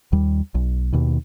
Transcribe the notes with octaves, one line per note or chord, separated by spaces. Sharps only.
D#2 G3
B1
D#2 B2 D#3